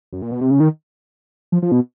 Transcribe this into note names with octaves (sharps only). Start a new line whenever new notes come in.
F#2
A#2
B2
C3
C#3
D#3
F3
F3
B2